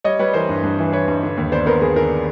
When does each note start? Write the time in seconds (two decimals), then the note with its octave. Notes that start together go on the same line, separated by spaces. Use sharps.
0.04 G3 C#5 D#5
0.19 G3 B4 C#5
0.34 E3 A#4 C5
0.49 G2
0.63 G2
0.79 E3
0.92 E3 B4 C#5
1.08 G2
1.23 D3
1.37 D#2
1.52 B3 C5 D5
1.66 B3 A#4 C5
1.81 D#2 G#4 A#4
1.96 D3 G#4 A#4